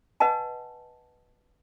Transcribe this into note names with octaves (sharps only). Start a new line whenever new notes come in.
B4 D#5 F#5 G#5 A5